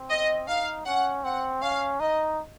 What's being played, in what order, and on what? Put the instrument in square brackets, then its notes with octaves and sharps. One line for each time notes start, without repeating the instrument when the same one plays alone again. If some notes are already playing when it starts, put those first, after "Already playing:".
Already playing: [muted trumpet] C4
[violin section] D#5
[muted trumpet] D#4 [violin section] F5
[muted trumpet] C#4 [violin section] F#5
[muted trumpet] C4 [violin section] F#5
[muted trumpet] C#4 [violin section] F5
[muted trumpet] D#4 [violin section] D#5